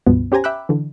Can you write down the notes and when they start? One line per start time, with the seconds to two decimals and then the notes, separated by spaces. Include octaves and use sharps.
0.07 C#2 G2 B2 F3 B3
0.32 C#4 G4 C5 G#5 A#5
0.44 E5 G5 B5 D6 E6 F#6
0.69 D3 E3